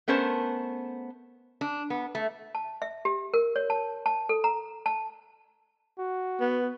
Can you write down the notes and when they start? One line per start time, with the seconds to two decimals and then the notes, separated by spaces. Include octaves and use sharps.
0.08 A3 B3 C#4 A#4 C5 A5
1.61 D4
1.90 B3
2.15 A3
2.55 A5
2.82 E5
3.05 G4
3.34 A#4
3.56 C#5
3.70 A5
4.06 A5
4.29 A4
4.44 A#5
4.86 A5
5.98 F#4
6.41 B3